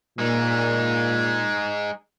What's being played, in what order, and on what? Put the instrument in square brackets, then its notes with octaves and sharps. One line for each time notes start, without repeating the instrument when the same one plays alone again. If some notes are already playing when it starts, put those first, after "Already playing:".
[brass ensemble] A#2 [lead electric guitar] G#3 D#4